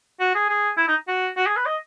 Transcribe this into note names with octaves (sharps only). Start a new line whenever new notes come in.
F#4
G#4
G#4
E4
D#4
F#4
F#4
G#4
B4
D#5